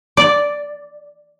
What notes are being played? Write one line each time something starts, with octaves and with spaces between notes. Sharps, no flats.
D5